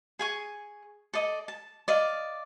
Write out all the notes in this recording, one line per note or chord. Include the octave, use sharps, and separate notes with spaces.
G#4 G#5 C#6
A4 D5 D#5
A5
D5 D#5 F5